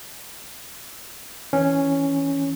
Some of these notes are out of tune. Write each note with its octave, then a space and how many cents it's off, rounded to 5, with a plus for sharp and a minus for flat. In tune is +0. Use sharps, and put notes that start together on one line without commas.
E3 +0 C#4 +0